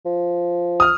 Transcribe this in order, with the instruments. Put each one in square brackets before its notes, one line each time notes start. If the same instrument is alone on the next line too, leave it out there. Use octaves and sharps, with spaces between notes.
[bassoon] F3
[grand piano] D#6 F6